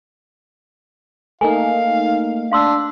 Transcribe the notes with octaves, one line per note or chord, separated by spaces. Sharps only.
A3 A#3 D#4 F5 G#5
D4 F5 C6 E6